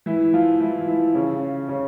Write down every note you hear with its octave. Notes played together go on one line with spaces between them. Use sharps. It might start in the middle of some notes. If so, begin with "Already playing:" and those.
E3 E4
F3 F4
E3 E4
E3 E4
C#3 C#4
C#3 C#4